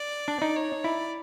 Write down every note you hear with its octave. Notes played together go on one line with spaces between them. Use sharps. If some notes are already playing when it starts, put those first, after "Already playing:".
Already playing: D5
D4
D#4
C#5
E4 D5